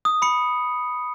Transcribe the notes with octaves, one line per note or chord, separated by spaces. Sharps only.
D#6
B5 C#7